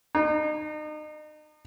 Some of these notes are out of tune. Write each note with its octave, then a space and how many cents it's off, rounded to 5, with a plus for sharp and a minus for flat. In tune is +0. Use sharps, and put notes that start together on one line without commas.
D#4 -35